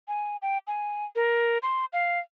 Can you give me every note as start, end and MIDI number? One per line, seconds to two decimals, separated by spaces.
0.08 0.37 80
0.42 0.58 79
0.67 1.05 80
1.16 1.58 70
1.63 1.85 84
1.93 2.19 77